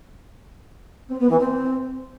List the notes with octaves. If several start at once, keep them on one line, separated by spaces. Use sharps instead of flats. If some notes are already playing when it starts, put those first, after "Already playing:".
C4
B3
E3
C4